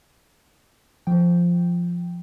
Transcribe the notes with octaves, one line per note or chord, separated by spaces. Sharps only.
F3 G5